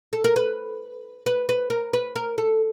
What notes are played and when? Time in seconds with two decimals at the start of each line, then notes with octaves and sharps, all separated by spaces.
0.13 A4
0.24 A#4
0.36 B4
1.26 B4
1.49 B4
1.70 A#4
1.93 B4
2.16 A#4
2.38 A4